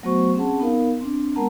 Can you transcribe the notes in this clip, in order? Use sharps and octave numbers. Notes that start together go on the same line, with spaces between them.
F#3 A3 B3 F#4 C5 C#6
C4 C#4 G#4 F#5 A5
B3 D#4 A#4 F5
C4 D4
G#3 B3 A#4 F#5 A5 A#5